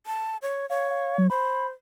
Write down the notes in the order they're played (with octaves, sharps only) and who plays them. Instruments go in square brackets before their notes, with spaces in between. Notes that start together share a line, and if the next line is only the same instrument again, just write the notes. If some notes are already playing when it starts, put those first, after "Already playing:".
[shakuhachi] A5
C#5
[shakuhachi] C#5 [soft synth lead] F5
[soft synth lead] F5
F#3
[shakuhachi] C5 [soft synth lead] B5